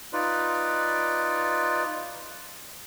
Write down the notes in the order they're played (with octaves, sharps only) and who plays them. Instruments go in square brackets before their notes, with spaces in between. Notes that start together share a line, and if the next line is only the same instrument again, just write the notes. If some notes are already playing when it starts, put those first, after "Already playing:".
[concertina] D#4 F4 B4 D5